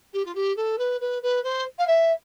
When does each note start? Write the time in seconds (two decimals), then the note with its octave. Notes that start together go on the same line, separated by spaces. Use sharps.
0.13 G4
0.25 F4
0.35 G4
0.56 A4
0.78 B4
1.00 B4
1.22 B4
1.44 C5
1.78 F5
1.87 E5